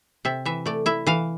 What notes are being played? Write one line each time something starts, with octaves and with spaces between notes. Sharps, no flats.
C3 E5
E3 E5
A3 D5
E4 E5
E3 F5